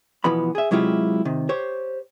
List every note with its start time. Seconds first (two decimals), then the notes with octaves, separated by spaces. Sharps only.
0.24 B2 E3 F3 B3 B5
0.55 G#4 E5
0.71 C3 F#3 G#3 E4 F4 G4
1.25 C3 D#3
1.49 G4 C5 C#5